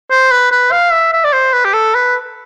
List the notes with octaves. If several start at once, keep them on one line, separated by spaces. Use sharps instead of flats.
C5
B4
B4
F5
E5
E5
D5
C5
B4
G4
A4
B4